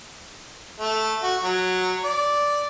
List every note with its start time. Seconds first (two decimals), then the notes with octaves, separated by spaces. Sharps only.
0.80 A3
1.23 F#4
1.43 F#3
2.04 D5